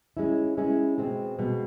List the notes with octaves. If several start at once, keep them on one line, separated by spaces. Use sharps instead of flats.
G#3 C#4 E4
G#3 C#4 E4
B2 G#3 C4
B2 G#3 C4